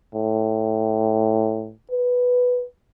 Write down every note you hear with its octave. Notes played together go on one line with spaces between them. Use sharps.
A2
B4